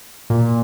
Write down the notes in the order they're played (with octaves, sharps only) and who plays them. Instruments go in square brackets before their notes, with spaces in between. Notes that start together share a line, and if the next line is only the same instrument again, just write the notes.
[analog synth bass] A#2